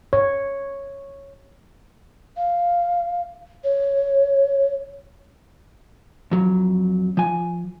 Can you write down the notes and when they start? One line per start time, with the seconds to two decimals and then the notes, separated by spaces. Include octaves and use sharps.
0.13 C#5
2.37 F5
3.64 C#5
6.31 F2 F#3
7.17 F3 G#5